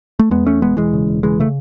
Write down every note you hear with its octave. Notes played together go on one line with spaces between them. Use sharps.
A3
E2 G#3 B3
E2 A3 C#4
E1 G#3 B3
E1 E3 G#3
C#3
E1
C#3 E3 G#3
C#3 A3